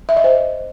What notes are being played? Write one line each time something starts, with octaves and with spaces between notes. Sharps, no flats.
E5
D#5
C5